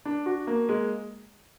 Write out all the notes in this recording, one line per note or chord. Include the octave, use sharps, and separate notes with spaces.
D4
F#4
A#3
G#3